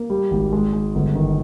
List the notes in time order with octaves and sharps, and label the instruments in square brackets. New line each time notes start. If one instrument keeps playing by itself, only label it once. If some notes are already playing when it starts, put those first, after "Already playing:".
Already playing: [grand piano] A#3
G3
G#1
G#3
G#3
G1
D#3